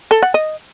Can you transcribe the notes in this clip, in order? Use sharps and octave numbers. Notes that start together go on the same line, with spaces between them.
A4
F#5
D#5